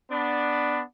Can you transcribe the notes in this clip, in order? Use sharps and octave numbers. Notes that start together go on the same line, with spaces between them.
B3 D4